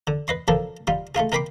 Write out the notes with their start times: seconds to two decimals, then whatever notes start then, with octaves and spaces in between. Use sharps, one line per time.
0.07 D3
0.28 B4 D#5 C6
0.48 B2 F3 D4 A4 A#4
0.87 G3 D#4 F4
1.15 A3 D#4 F4 G#4
1.32 D#4 A#4 G5 B5 C6 D6